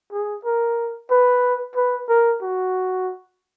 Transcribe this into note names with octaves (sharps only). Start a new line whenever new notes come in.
G#4
A#4
B4
B4
A#4
F#4